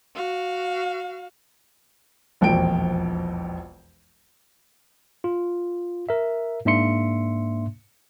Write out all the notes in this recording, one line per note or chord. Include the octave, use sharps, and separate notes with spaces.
F#4 F5
E1 A#1 F2 G5 D7
F4
A#4 E5
G#2 A#3 D4 E5 C6 C#7